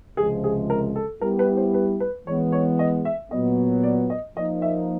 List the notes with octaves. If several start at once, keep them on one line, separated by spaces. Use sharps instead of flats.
C#2 C3 F3 G#3 G#4
G#4
A#4
A4
G3 B3 E4 G4 A#4
B4
C5
B4
B4
E3 G#3 B3 C#5
C#5
D#5
E5
A#2 F#3 B3 D#5
D5
D#5
F3 A#3 D#4 D#5
E5